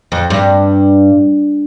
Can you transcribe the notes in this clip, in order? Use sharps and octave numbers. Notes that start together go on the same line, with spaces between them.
F2
G2